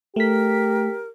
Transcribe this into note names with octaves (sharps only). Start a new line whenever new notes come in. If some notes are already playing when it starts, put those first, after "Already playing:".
A3 G4 A#4 B6